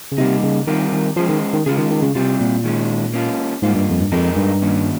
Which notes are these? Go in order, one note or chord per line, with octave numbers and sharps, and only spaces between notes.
C#3
C3 G3 A#3 D#4
C#3
D#3 G3 C4 F4 A#4
D#3
F3 G#3 C#4 G#4 C5
D#3
D#3
C#3 G#3 C#4 F4 G#4
D#3
D#3
C#3
C3 G3 C4 F4
A#2
D#3 G#3 C#4
A#3 C#4 F4
G#2 G3 A#3 F4
G2
F2
G2
F2 A#2 G#3 D#4 A#4
G2
D#3 A#3 C#4